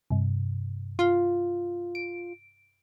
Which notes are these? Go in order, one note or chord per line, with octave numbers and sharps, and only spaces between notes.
G2 C3
F4
D7